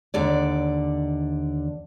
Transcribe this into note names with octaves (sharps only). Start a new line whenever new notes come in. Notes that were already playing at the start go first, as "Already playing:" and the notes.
D#2 D3 D5